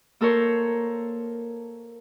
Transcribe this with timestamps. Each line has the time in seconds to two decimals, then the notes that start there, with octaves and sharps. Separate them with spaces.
0.21 A#3 A4 A#4 C5 C#5